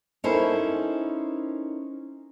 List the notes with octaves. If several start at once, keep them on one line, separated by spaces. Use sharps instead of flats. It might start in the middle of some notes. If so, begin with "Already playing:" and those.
C#4 D#4 E4 A4 A#4 C5